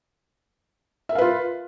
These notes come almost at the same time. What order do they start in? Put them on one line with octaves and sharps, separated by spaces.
E5 A#4 F5 B4 F4